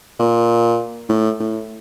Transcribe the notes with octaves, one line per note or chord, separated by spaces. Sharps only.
A#2
A2
A2